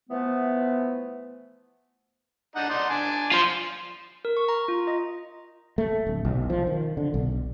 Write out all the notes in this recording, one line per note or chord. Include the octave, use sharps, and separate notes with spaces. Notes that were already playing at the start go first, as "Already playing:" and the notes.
E3 F3 A3 B3
D4 D#4 F#5
D#4 D5 C6
D4 G#5 D6
F4 C5
A#4
C#6
A#5
F4
D#5
A3
D1
B1
F3
D#3
D3
B1